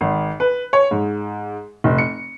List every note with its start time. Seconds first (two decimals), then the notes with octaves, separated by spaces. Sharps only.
0.01 G#1
0.40 B4
0.73 C#5
0.91 G#2
1.84 F1
1.98 C#7